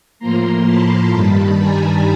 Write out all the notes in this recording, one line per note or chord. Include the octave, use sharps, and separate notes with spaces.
A2 F3 A#3 A#5 C6
A5 B5
G2 D#3 G3 A5 B5
G#5 A#5